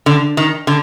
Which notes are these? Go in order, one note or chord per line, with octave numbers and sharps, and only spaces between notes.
D3
D#3
D3